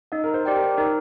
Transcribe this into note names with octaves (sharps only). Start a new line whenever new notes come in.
D#4 D#5
A#4
C5
G4 D5 G5
A#4
D#4 A#4